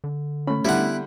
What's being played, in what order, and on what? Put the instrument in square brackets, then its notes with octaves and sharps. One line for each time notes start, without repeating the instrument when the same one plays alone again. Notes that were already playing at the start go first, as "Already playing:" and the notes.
[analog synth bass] D3
[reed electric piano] A3 C#4 [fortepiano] B5
[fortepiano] D3 G3 [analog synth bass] B3 [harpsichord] E4 F#5